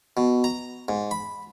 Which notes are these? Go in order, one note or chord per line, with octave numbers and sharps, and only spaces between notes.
B2
A#5
G#2
B5